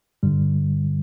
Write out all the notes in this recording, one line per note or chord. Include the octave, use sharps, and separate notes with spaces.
G2 D3 G3